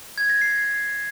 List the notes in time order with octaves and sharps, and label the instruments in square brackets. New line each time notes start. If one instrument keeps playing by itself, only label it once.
[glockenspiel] G#6
A#6
C7